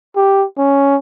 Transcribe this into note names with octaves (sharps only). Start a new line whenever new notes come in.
G4
C#4